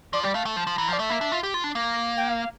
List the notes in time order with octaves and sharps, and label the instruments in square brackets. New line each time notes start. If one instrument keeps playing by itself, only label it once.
[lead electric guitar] F3 [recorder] D5
[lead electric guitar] G3 [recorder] D5
[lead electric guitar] A3 [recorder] F5
[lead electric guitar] A3 [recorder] A5
[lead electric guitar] F3 [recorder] A5
[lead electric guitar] F3
[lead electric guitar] E3 [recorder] A#5
[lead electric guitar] F3
[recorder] D5
[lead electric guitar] A3 [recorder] E5
[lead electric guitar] A#3
D4
F4
G4
F4
D4
A#3
[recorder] G5
F5